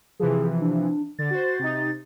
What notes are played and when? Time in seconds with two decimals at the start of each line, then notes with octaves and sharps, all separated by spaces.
0.20 C3 E3 F3 G#4
0.61 D4
1.19 D3 A6
1.31 F#4 C5
1.59 C3 D#4